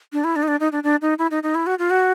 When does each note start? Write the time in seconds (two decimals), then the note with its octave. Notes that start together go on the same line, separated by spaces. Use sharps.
0.13 D4
0.24 E4
0.36 D4
0.43 D#4
0.48 D4
0.60 D#4
0.72 D4
0.83 D4
1.01 D#4
1.18 E4
1.31 D#4
1.43 D#4
1.55 E4
1.66 F#4
1.79 F4
1.90 F#4